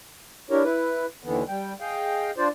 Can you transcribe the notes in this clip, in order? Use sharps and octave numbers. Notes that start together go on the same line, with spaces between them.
D4 E4 G4 A#4 C#5
E4 B4
D#2 D3 E3 B3
G3 G5
G#4 D#5 F5 G5
D4 F4 C5 D5